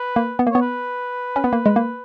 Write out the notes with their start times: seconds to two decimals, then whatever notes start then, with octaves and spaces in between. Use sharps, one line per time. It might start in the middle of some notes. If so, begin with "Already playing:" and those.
Already playing: B4
0.16 A#3
0.39 B3
0.47 A#3
0.52 B3 C#5
0.62 B4
1.36 C#4
1.44 B3
1.53 A#3
1.66 G#3
1.76 A#3